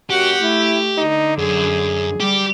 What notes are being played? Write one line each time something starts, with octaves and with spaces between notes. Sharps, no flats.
F#2 F#4 G4 F#5
A3 E4
D3 D#4
F#2 G#4
G3 G4